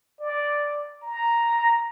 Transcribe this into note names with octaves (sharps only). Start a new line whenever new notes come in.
D5
A#5